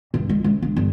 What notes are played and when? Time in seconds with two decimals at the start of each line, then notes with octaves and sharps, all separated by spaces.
0.14 G2
0.29 G#3
0.44 C#2
0.62 D4
0.77 G1